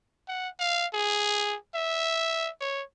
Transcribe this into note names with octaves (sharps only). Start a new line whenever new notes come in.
F#5
F5
G#4
E5
C#5